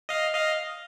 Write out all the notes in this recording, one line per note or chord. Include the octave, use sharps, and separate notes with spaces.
D#5 F5
D#5 F5